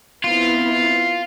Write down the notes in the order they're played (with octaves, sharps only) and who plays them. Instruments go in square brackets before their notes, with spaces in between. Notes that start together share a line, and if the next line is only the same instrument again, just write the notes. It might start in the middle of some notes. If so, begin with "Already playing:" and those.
[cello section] B3 C4 E4 [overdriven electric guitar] F4